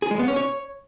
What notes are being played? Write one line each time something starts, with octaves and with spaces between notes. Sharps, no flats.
G#4
G#3
B3
C#4
C#5